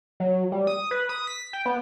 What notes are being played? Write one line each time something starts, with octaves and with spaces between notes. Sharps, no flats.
F#3
G3
D#6
B4
D#6
B6
G5
B3